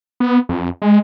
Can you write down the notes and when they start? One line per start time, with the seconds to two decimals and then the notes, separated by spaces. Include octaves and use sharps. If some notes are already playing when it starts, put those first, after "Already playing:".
0.20 B3
0.49 F2
0.82 G#3